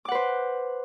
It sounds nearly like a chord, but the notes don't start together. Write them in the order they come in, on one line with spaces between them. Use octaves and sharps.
D6 F#5 B4 C5